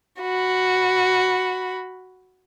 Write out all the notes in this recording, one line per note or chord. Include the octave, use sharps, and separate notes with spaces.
F#4 B5